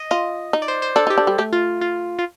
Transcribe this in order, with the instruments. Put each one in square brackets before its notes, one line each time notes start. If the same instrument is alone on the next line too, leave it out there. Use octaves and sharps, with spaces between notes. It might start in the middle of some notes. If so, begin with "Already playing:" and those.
Already playing: [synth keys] D#5
[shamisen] F4 [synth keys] D#5
[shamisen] D#4
[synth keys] D5
C5
C5
[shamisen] D4 [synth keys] A4
[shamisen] D#4 [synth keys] G4
[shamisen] D4
G3
[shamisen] A3 [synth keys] G4
[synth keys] F4
F4
F4